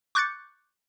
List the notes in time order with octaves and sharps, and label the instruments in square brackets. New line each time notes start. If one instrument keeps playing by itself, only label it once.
[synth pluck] C#6 D6 F#6 G6 A6 C#7